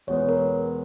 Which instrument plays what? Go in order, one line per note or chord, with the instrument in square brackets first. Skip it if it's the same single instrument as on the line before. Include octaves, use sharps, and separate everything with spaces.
[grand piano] E2 B2 G#3 B3 [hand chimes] C#5
[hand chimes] A#4